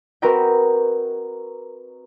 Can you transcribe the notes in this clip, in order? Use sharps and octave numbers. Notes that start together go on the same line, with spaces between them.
C4 F#4 A#4 B4 D#5 G5